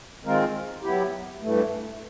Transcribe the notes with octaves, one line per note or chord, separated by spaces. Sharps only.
D#3 G#3 C4 F4 A#4
F#3 B3 E4 G4
G2 E3 A3